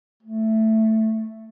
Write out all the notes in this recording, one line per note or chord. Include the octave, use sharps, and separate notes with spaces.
A3